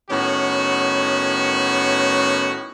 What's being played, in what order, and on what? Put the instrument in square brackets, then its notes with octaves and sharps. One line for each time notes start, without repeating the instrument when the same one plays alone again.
[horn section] A2 D#3 B3 C#4 F#4 C#5